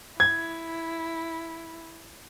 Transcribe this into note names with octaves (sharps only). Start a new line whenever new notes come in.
E4 G#6